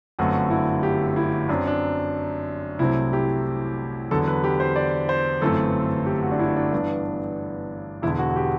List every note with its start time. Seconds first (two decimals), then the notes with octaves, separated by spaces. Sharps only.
0.19 G1 F#2 D3 A3 C4 F#4
0.50 E4
0.83 G4
1.16 E4
1.49 F#2 F#3 C4 D4
1.67 D4
2.79 C2 C3 F#3 A3 C4 E4
3.13 G4
4.11 E2 D3 F#3 A4
4.28 B4
4.44 G4
4.60 C5
4.76 D5
5.09 C5
5.42 G1 F#2 E3 A3 C4 A4
6.06 G4
6.23 F#4
6.32 D4
6.39 E4
6.56 D4
6.73 G2 E3 B3
8.02 E1 E2 D3 E4
8.19 F#4
8.36 G4